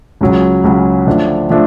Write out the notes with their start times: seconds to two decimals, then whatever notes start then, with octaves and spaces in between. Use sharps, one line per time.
0.21 C#2 C#3 F#3
0.64 C#2 C#3 F#3
1.07 D3 F3 A3 D4
1.50 D3 F3 A3 D4